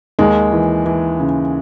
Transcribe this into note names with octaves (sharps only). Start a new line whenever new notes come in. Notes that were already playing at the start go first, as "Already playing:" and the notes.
D#2 G#3
E3
E3
C#3